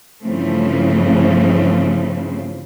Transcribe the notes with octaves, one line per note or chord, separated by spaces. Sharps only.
G2 C#3 E3 F3 A3 C4